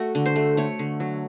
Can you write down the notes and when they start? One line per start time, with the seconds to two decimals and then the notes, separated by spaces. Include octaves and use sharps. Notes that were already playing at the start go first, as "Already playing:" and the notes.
Already playing: A3 F#4
0.15 D3
0.26 C5
0.36 A3
0.57 A3 C#5
0.79 D3
1.00 F#3